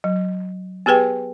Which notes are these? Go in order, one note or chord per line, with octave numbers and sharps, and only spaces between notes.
F#3
B3 G4 G#4 B4 G5